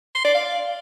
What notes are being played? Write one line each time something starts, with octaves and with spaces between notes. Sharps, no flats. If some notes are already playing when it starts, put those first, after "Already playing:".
C6
D5
F5